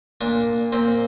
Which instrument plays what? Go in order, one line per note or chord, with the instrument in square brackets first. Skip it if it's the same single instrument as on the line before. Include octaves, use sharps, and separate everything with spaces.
[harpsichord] A#2 D4
A#2 C4